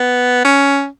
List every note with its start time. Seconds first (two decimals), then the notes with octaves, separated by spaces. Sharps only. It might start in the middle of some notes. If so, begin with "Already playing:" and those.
Already playing: B3
0.44 C#4